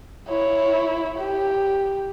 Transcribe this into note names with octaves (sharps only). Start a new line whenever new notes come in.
E4 C#5
G4